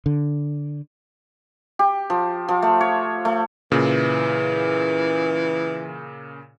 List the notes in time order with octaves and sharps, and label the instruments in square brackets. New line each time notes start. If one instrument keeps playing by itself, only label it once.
[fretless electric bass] D3
[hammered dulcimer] G4
F3
F3
A3
C#5
A3
[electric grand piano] A#2 C#3 [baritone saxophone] E3